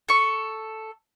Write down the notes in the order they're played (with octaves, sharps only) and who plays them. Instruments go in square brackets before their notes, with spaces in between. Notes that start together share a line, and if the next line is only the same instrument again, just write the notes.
[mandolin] A4 C#6